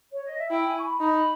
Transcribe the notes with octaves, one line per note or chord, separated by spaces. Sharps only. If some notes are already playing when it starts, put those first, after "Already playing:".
C#5
D#5
E5
E4 G5
G#5
C#6
B5
D#4 B5